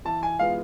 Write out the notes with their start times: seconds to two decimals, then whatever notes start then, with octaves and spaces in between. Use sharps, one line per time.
0.05 E3 A5
0.23 G#5
0.39 G#3 B3 F4 F5